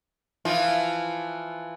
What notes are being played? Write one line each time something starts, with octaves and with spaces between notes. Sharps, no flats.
E3 F3 F4